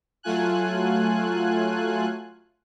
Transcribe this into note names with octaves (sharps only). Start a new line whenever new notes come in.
F#3 A3 F4 G#5 F#6